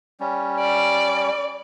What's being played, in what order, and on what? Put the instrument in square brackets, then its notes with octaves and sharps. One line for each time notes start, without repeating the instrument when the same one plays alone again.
[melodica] G3 C#4
[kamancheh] D5